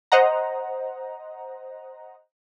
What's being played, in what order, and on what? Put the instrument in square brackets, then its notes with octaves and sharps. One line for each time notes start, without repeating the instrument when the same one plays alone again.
[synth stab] C5 D#5 F#5 A#5